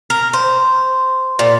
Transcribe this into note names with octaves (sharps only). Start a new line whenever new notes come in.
A#4
C5
A#2